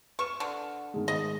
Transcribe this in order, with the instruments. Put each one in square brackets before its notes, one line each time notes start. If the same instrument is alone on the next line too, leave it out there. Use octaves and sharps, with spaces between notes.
[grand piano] B4 F6 E7 [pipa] C#6
[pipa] D3
[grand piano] G#2 D#3 G#3
[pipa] D#5